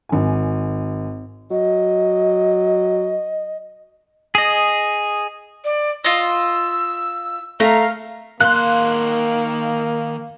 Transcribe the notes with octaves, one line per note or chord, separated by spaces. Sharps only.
G#1 G#5
F#3 D#5
G#4 D#5
D5
F4 D#5 E6
A3 A#4 F5
D#3 A#3 F5 C6 F#6